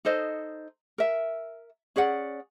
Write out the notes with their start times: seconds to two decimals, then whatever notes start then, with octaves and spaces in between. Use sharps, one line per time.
0.05 D#4 A4 C5 D#5
0.98 A#4 E5
1.96 C#4 G#4 D5 F#5